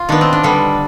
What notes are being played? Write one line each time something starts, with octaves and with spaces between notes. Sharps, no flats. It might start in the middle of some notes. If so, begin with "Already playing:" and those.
Already playing: F4
D#3 B3 D4
C4
D4
D3 G3 B3